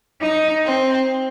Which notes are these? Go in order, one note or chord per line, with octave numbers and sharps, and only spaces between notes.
D#4
C4